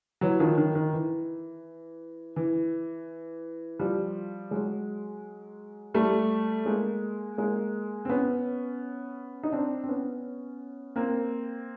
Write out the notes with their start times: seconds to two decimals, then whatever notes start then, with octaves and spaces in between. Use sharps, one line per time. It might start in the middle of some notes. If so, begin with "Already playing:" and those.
0.21 E3 F#3
0.40 D#3 F3
0.58 D#3
0.75 D#3
0.93 E3
2.36 E3
3.79 F3 G3
4.51 F#3 G#3
5.94 G3 A3
6.66 G#3 A#3
7.38 G#3 A#3
8.05 C4
8.09 B3 C#4
9.43 D#4
9.52 C4 D4
9.84 C4
9.88 B3 C#4
10.96 A#3 C4